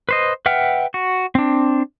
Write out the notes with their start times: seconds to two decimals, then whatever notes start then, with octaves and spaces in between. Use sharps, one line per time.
0.09 B4 C5 D#5
0.46 B4 E5 F#5 G5 F6
0.94 F#4
1.35 C4 D4